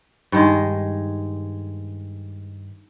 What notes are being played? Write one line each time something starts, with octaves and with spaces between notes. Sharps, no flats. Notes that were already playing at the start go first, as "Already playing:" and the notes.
G2 D#3 G#3